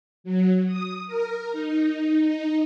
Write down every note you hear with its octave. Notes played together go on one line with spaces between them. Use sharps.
F#3
D#6
A#4
D#4
D#4